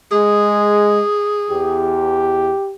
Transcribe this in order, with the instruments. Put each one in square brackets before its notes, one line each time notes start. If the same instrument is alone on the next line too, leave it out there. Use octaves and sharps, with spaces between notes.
[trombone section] G#3 [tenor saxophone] G#4
[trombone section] E2 [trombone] G4